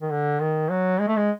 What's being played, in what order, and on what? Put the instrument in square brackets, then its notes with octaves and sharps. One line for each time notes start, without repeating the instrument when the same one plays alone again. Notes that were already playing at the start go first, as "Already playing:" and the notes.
[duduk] D#3
D3
D#3
F#3
G#3
A3
G#3